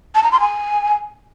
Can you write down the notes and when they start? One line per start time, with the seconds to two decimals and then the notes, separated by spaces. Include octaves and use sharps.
0.15 A5
0.23 A#5
0.32 C6
0.40 G#5